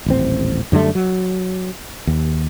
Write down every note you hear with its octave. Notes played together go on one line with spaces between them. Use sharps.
D#1 A1 C4
F#2 D3 G3 A3
F#3
D#2